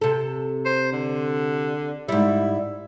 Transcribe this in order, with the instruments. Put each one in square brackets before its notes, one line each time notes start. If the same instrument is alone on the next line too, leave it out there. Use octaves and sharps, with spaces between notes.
[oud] C3 A4
[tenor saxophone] C5
D3
[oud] G#2 G3 [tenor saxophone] E4